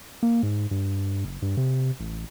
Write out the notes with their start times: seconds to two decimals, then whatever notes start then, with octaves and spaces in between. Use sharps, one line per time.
0.23 A#3
0.43 G#2
0.71 G2
1.25 F#1
1.42 G2
1.57 C3
2.00 A1